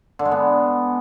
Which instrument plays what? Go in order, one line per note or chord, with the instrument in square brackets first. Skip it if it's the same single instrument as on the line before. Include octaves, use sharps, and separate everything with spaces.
[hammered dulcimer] D3
G#3
B3